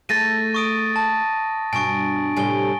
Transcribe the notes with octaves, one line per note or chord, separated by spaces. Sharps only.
A3 G#4 A4 A6 A#6 D#7
C#6 D#6 D7
A5
G2 B2 G#5 C#6 D7
A2 C3 G3 G#5 G7